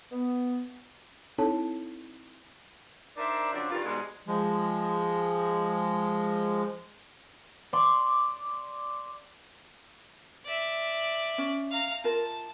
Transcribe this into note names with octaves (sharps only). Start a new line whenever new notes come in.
B3
C4 D#4 E4 A4 C#5 A5
D4 D#4 A#4 C5 D5 E5
C#3 F3 F#3 C4 D4
G2 D#3 D4 F4
G#2 B2 G3 G#3
F3 G#3
D5 C6
D5 E5
C#4
F5 A#5
F4 A#4 A5